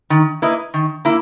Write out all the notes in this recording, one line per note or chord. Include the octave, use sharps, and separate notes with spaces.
D#3
A#3 E4 B4 D#5
D#3
A#3 E4